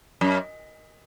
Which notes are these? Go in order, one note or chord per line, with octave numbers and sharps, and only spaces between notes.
F#2